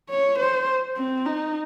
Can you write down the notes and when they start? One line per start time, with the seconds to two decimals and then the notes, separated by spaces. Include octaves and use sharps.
0.10 C#5
0.39 C5
0.97 C4
1.26 D#4